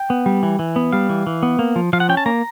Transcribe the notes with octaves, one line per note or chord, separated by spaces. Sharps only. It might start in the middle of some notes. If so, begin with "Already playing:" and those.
Already playing: G5
B3
G3
E3
E3
B3
G3 F5
E3
E3
B3
A#3
F3
F3 F5
F#5
C#4 G5
A5
A#3 A#5